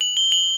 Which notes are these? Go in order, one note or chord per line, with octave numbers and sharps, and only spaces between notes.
F#7
G7
F#7